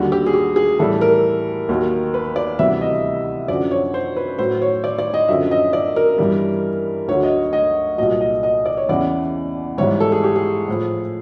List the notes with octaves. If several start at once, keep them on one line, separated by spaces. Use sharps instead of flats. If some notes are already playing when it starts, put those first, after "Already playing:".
Already playing: D#2 D3 G3 F#4
G4
G#4
G4
G#4
A2 E3 G3 A4
A#4
D#2 D#3 F#3
B4
D5
D2 C3 E3 G3 E5
D#5
F#2 D3 F3 D5
C#5
C5
B4
A2 F#3 C5
C#5
D5
D5
D#5
F#2 D3 F3 E5
D#5
D5
A#4
G2 E3 G3
D2 D3 F#3 C#5
D#5
D#5
C2 A#2 F#3 D#5
D#5
D#5
D5
C#5
E2 C#3 E3 D5
G#2 E3 G3 C#5
A4
G#4
G4
G#4
A2 F3